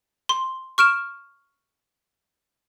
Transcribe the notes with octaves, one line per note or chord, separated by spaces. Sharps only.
C6
C#6 F6 D7 E7